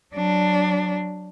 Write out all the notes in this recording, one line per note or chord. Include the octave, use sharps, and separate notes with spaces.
F#3 D4